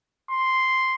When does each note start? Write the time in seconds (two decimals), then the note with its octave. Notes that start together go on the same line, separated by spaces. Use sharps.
0.31 C6